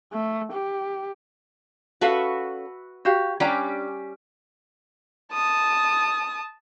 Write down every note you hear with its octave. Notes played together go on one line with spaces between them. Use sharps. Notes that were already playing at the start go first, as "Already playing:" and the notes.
A3
G4
C#4 F#4 A4 B4 E5 F5
F#4 G4 F5
G3 C#4 D4 G4 G#5 A#5
A5 D#6